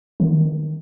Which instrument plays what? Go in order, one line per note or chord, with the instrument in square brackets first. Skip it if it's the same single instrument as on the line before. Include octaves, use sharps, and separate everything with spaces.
[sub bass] D#3